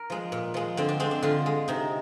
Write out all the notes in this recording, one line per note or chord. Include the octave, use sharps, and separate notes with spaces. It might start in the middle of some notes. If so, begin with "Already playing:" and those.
Already playing: A#4
F3 G#3
A#2
F3 G#3
D3 C4
D4
G#3 C4
D4
D3 F4
G#3
C3 D#4